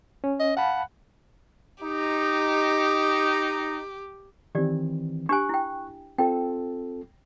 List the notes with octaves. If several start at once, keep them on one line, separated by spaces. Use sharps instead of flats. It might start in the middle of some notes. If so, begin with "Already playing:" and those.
C#4
D#5
F5 F#5 A5 B5
D#4 G4
D#3 E3 C4 G4 D5
D4 G4 G#5 C#6 F#6
E4 G5
C4 F4 A4 G5